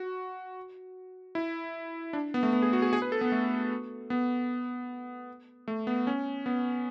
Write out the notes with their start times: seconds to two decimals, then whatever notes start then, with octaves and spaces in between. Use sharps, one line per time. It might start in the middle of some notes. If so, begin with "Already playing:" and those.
Already playing: F#4
1.35 E4
2.13 D4
2.34 B3
2.43 A3
2.53 B3
2.62 G#4
2.73 F#4
2.82 G#4
2.93 G#4
3.02 B4
3.12 A4
3.21 B3
3.32 A3
4.10 B3
5.68 A3
5.87 B3
6.07 C#4
6.46 B3